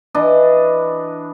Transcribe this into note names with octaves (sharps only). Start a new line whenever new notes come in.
E3 D4 D#5